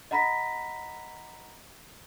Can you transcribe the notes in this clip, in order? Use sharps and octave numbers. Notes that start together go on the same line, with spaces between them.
D#5 F#5 A#5 B5 A#6 B6